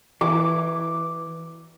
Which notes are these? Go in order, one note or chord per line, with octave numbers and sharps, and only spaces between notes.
E3 D6